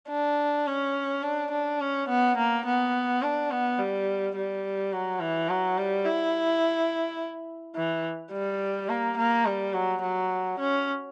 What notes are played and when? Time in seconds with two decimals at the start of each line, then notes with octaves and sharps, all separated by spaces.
0.09 D4
0.67 C#4
1.23 D4
1.51 D4
1.81 C#4
2.09 B3
2.37 A#3
2.66 B3
3.22 D4
3.51 B3
3.79 G3
4.36 G3
4.93 F#3
5.20 E3
5.49 F#3
5.77 G3
6.05 E4
7.76 E3
8.32 G3
8.89 A#3
9.17 A#3
9.46 G3
9.74 F#3
10.02 F#3
10.59 C#4